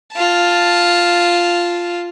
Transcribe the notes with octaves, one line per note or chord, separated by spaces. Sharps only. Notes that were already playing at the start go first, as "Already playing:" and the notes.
F4 A5